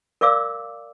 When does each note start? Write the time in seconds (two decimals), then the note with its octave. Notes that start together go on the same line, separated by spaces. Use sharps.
0.21 A#4 D5 F5 D6 E6